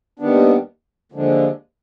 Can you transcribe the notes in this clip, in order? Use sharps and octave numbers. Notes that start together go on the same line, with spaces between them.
D#2 D#3 G3 B3 D4
D#2 D3 F3 G#3 D4